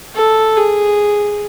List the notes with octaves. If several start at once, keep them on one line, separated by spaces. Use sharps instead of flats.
A4
G#4